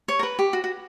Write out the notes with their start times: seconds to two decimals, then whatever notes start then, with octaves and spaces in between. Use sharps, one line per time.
0.08 C#5
0.19 A#4
0.23 B4
0.39 G4
0.53 F#4
0.64 F#4